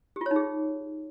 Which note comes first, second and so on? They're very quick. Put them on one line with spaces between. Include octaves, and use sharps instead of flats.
G4 F4 C#5 D#4 G#4